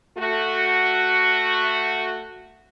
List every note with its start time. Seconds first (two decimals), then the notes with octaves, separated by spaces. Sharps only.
0.18 A3 F#4